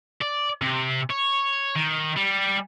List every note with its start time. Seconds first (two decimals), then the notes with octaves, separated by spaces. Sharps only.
0.21 D5
0.62 C3
1.10 C#5
1.76 D#3
2.16 G3